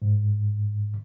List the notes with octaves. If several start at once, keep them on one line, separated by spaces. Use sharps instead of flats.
G#2